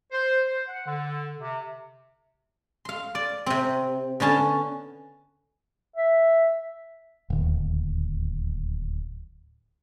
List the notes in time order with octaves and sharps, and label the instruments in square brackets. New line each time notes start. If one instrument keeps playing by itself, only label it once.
[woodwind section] C5
C5
F#5
D3
C3
[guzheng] F5 C6
D5
C3 C4
D3 B3 C#4 A5
[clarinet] E5
[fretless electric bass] D1 D#2